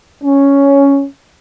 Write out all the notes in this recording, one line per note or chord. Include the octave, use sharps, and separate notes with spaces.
C#4